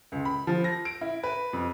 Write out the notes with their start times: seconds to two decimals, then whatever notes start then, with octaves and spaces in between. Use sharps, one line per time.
0.12 C#2
0.25 B5
0.47 F3
0.64 A#6
0.85 D7
1.01 E4
1.23 B4
1.53 F2